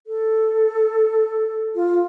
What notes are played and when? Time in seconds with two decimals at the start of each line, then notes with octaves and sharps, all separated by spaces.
0.07 A4
1.75 F4